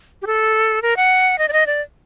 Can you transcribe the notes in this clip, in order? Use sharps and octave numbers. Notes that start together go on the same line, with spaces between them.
G4
A4
A#4
F#5
D#5
D5
D#5
D5